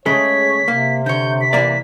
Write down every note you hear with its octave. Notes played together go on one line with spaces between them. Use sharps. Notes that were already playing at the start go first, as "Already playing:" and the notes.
C#3 G#3 A3 C#5 B6
C3 A#3
D3 C#5 G6
B6
E3 A#3 D5